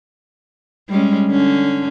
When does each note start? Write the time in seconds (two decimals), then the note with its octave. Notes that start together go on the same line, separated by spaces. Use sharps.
0.89 G3 G#3 C#4
1.29 D3 C#4